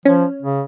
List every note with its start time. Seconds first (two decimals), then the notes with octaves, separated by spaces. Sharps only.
0.05 F3 C#4
0.43 C#3